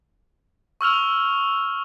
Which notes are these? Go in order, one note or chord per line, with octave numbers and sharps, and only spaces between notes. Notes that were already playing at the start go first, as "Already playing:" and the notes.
C#6 E6 F6 F7